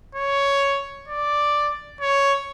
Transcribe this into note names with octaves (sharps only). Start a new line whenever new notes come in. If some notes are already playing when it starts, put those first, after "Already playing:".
C#5
D5
C#5